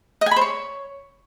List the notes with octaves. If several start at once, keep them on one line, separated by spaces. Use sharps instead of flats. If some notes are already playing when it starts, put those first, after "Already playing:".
D#5
G#5
B5
C5
C#5